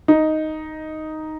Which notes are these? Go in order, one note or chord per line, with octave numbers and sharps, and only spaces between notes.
D#4